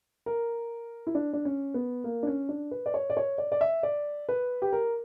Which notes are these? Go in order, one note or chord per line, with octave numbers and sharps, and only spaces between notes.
A#4
E4
D4
D4
C#4
B3
A#3
D4
C#4
D4
B4
D5
C#5
D5
C#5
D5
D5
E5
D5
B4
G4
A#4